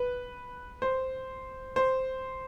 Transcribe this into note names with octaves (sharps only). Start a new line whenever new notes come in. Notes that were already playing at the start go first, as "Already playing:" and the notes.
Already playing: B4
C5
C5